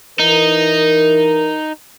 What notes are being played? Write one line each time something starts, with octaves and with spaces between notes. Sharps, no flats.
E3 D#4 A#4